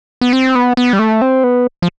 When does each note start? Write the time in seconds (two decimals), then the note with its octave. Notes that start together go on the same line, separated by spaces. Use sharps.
0.21 B3
0.33 C4
0.55 B3
0.77 B3
0.93 G3
0.99 A3
1.21 C4
1.44 B3
1.82 F3